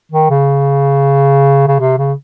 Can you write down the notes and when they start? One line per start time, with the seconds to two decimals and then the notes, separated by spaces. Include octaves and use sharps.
0.12 D#3
0.30 C#3
1.68 C#3
1.80 C3
1.98 C#3